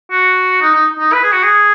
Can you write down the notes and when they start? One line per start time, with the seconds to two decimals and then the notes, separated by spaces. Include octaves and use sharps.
0.11 F#4
0.62 D#4
0.75 D#4
1.00 D#4
1.13 B4
1.23 G#4
1.32 F#4
1.43 G#4